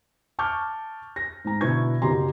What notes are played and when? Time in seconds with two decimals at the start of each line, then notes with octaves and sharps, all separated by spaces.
0.39 A5 C#6 D6 F6 G6
1.16 A#6
1.45 G#2 A#5
1.61 B2 D3 E4 B4 C#6 G#6
2.02 F#1 F#3 G4 A#5 C6